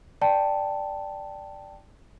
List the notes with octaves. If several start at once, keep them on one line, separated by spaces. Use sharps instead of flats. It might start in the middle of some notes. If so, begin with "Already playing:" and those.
D5 G5 A5